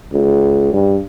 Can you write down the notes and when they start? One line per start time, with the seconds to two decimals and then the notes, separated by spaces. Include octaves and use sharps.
0.12 C#2
0.73 G2